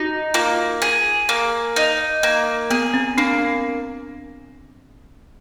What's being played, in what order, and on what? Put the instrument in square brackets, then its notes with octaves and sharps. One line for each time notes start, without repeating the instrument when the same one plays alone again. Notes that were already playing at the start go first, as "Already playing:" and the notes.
Already playing: [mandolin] D#4 [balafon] F#4
[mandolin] A#3 [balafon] F4
[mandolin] G#4
A#3
D#4
A#3
[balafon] B3 [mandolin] G#4
[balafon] C4
[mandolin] A#3 [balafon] D4